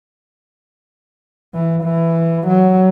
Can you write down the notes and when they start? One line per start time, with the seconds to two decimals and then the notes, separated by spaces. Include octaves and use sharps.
1.54 E3
1.83 E3
2.48 F#3